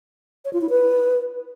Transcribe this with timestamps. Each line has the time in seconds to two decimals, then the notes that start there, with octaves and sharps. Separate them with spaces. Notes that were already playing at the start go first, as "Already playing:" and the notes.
0.45 C#5
0.53 F4
0.61 E4
0.70 B4